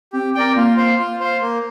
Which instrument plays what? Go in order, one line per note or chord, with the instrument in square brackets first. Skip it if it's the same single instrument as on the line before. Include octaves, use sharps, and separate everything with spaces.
[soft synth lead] C4 [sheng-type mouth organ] G4
[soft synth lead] C4 [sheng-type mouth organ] A#4 D5 G5
[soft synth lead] A#3 [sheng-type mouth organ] F4
[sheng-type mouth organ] C5 F5
F4
C5 F5
A#3